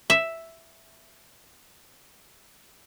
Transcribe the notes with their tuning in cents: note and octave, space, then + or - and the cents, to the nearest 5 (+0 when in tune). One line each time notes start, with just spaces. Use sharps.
E5 +0